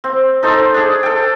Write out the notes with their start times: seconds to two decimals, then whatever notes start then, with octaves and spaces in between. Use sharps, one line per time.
0.04 C4
0.43 D#4 A4 C5 D#5
0.74 D4 G#4
1.03 A4 G5